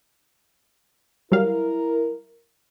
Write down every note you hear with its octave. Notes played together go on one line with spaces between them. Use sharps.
F#3 G3 E4 A#4 F5